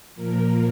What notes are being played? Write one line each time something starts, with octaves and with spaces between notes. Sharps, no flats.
A#2 F3 A#3 A#4